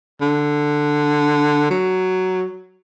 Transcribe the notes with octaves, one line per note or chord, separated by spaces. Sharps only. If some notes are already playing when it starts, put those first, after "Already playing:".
D3
F#3